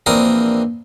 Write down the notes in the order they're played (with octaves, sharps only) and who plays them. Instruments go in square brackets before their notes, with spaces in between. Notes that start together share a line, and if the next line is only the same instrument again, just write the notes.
[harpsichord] A#1 E3 C4 D4 A#4 D#6